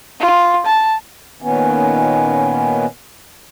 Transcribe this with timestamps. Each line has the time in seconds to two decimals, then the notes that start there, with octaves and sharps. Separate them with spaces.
0.20 F4
0.66 A5
1.42 A#2 D#3 B3 C#4